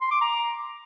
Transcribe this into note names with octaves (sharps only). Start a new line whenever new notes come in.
C6
D6
A#5